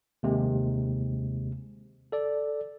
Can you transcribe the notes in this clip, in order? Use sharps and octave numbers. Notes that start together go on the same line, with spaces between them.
D#2 C3 G#3
A4 D5